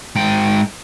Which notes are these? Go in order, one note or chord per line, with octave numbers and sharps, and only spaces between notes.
G#2 G5